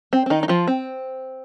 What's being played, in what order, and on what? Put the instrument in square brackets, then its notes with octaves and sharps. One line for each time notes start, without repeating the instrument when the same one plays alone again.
[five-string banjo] C4
C4
D#3 D#4
D#4
F3 F4
C4